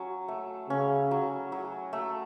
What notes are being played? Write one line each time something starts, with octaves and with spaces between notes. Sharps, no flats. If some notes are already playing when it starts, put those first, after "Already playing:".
Already playing: F#3 C#4
A3
C#3 C#4
F#3
F#3
A3